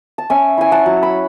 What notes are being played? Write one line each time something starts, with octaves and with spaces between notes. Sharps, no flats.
A5
C#4 E5 G#5
E4 G#5
F#5 A5
F#3
B5